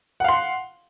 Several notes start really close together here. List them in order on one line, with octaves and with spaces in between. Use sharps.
F#5 F5 C6